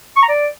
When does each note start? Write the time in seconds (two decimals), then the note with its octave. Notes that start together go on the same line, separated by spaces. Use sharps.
0.16 C#6
0.22 A#5
0.29 D5